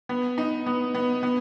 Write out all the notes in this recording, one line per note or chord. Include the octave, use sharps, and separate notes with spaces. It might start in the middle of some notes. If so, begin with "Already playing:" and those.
B3
D#4
B3
B3
B3